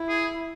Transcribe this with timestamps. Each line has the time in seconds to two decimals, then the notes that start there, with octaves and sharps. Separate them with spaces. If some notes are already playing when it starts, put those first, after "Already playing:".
Already playing: E4
0.09 G#4